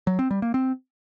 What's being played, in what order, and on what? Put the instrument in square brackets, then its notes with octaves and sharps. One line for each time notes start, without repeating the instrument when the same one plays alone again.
[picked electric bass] F#3
C4
G3
A#3
C4